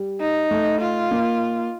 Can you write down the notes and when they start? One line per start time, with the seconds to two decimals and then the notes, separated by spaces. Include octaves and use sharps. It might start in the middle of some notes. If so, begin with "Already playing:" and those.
Already playing: G3
0.20 D#4
0.51 A3
0.81 F4
1.11 A#3